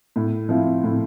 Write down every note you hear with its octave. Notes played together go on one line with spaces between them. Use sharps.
A2
F3 C4 E4
A2